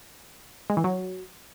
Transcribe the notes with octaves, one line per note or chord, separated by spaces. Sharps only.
G#3
E3
F#3